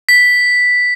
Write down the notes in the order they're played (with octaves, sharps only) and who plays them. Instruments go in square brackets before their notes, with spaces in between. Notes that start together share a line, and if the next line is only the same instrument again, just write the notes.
[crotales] B6